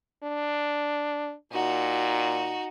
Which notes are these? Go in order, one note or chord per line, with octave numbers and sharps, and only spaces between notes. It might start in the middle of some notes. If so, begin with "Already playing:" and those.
D4
A#2 D#4 F#4